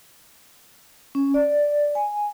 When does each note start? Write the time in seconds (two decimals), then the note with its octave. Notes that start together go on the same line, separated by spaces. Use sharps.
1.15 C#4
1.34 D5
1.95 G#5